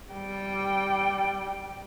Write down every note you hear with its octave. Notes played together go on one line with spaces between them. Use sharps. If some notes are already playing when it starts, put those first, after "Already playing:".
G3 G5